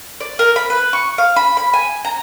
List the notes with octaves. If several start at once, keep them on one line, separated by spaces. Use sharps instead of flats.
D5
A#4
B5
B4
C#6
F5
B5
B5
G#5
A#5